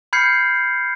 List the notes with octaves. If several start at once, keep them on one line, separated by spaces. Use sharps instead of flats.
B5 F6 G6 G#6 C7 C#7